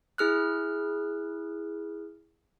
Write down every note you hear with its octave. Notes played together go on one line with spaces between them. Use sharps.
E4 G#4 F6 F#6